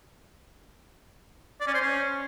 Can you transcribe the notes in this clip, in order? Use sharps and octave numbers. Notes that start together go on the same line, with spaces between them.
D5
C#4
C5
C#4